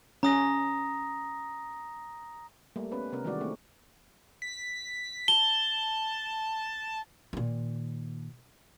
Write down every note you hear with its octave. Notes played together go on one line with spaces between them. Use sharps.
C#4 A#5 D#6 A#6
G3 A3 A#3
B3 C#4 B4
C3 B3 C#4 A#4
D#3 E3 G3 G#3 F#4 D5
A3 A#3 C4
B6
A5 G7
A#2 D#3